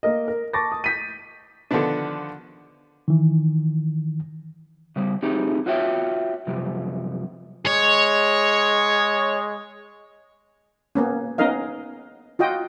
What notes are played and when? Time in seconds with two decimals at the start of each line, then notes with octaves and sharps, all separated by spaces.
0.03 A#3 A#4 D#5
0.28 A#4
0.53 A5 C#6 D6 A6 A#6
0.72 D#6
0.84 G6 B6 D#7
1.71 D3 D#3 F3 B3 D4
3.08 D#3 E3
4.96 C#3 G3
5.22 A3 C4 D#4 G4 G#4
5.66 F4 F#4 C#5 E5 G5
6.47 F#2 C3 F3 G3
7.67 G#3 C#5
10.95 A#3 B3 C#4
11.38 B3 C#4 D#4 A#4 D#5 F5
12.39 F4 F#4 D#5 G5